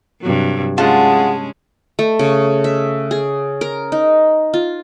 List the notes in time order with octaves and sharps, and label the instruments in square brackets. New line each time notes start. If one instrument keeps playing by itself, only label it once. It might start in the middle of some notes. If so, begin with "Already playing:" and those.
[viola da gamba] G2 C3 F#3
[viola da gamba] G#3 C#4 [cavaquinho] F4 F#5 [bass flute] G#4 [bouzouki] A5
[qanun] A3
C#3
E5
G#4
A#4
D#4
F4